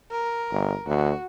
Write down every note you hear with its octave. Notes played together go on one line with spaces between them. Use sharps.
A#4
G1
D2 F#4